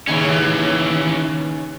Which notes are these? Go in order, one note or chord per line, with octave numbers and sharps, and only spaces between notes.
D#2 C#3 E3 C#4